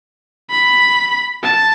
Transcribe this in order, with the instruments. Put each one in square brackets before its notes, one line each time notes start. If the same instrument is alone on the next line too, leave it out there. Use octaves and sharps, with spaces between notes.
[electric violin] B5
A5